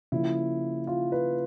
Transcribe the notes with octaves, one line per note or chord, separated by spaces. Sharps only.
C#3 F3 A#3 E4
F4
B4